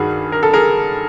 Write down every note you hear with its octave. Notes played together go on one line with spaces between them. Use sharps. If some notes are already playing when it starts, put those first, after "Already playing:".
Already playing: G2 D#3 F#4 G#4
A#4
A4
G#4 A#4